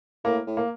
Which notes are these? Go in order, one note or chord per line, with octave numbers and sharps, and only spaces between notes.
A2 A#3
A2
A#3